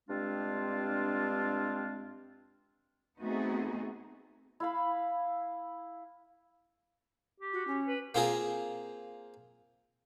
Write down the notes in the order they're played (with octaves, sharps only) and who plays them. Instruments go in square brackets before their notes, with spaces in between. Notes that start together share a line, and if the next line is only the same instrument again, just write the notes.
[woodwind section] G2 G#3 C4 D4 F4
[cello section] A3 B3 C4 D#4 F#4 G#4
[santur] E4 F5 B5
[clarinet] G4
[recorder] F#4
C#4
[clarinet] B4
[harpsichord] A#3 C4 F4 G#4 A#4